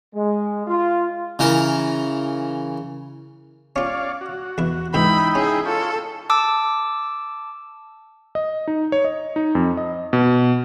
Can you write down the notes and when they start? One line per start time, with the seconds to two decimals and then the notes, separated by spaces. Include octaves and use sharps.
0.15 G#3
0.67 F4
1.39 C#3 E3 A#4
3.76 C#4 F4 C#5 D5 F5
4.21 F#4
4.58 E2 E4
4.94 C#2 G#2 E3 D#4 E4 G5 B5
5.35 C#4 G#4
5.66 F4 A4 C#5
6.30 A5 D6 E6
8.35 D#5
8.68 D#4
8.92 C#5
9.04 D#5
9.36 D#4
9.55 F2
9.77 D#5
10.13 B2